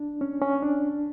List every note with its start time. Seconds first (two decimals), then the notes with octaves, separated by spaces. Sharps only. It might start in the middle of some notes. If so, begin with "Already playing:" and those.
Already playing: D4
0.21 C#4
0.42 C#4
0.62 D4